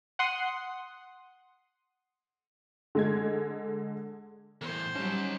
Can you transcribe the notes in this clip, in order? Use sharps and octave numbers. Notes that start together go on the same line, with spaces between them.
F#5 C6 D#6
D3 G#3 G#6
E2 A2 C5
F#3 G3 C#4 D#4 A5